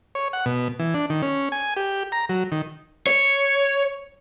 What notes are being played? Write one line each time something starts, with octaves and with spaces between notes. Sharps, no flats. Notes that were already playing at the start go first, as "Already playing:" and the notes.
C#5
F#5
B2
E3
D4
D#3
C#4
G#5
G4
A#5
F#3
D#3
C#5